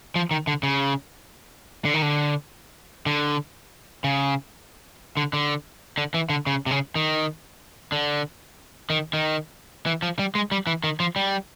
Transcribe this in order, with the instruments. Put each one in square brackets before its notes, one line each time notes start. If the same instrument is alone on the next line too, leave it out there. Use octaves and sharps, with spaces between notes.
[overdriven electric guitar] F3
D#3
D3
C#3
D3
D#3
D3
D3
C#3
D3
D3
D3
E3
D3
C#3
C3
C#3
D#3
D3
D#3
D#3
E3
F3
G3
G#3
G3
E3
D#3
F3
G3